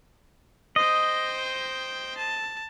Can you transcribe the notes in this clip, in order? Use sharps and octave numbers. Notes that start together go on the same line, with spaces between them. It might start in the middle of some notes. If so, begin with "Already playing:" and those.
C5 D#5 G5
A5